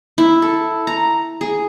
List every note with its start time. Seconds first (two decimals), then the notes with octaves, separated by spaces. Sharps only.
0.18 E4
0.42 A4
0.87 A#5
1.41 G#4